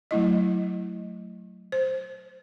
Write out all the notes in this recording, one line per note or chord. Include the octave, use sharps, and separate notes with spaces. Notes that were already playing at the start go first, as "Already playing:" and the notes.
F#3 A3 E4 D#5
C5